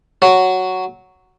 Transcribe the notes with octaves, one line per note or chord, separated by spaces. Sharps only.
F#3